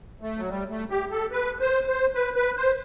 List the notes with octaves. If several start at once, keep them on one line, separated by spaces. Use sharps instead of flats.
A3
F#3
G3
A3
G4
A4
B4
C5
C5
B4
B4
C5